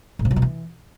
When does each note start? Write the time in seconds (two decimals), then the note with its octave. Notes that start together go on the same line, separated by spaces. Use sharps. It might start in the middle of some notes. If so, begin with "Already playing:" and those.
0.19 A2
0.25 C3
0.31 F#3
0.36 B2
0.42 E3